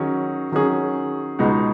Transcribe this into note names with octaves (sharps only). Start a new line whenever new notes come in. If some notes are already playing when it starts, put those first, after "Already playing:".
Already playing: D#3 F#3 C#4 G#4
D#3 F#3 C#4 G#4
C#2 B2 G#3 D#4